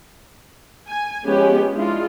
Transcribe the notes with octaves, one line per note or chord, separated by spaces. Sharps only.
G#5
F3 G#3 B3 C#4 G4
G#3 D4 E4 F4